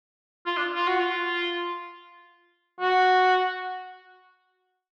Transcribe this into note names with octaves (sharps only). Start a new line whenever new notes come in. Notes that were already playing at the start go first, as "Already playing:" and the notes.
F4
D4
F4
F#4
F4
F#4